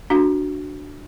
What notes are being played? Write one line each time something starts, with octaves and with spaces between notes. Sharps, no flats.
D4 F#4 F5